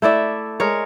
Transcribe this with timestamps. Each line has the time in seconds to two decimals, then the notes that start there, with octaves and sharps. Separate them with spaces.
0.02 A3 E4 D5 E5
0.60 G#3 A#4 C#5